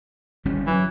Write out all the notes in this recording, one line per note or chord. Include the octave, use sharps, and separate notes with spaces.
G1 G3 C#4
E3 F#3